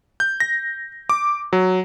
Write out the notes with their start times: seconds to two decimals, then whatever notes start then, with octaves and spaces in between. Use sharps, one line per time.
0.20 G6
0.40 A#6
1.10 D6
1.53 F#3